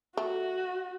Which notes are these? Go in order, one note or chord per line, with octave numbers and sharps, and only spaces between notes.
A3 F#4